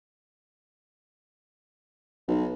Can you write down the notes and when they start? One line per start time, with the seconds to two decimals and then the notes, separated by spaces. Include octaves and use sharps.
2.28 B1